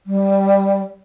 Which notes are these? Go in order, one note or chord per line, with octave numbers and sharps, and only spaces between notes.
G3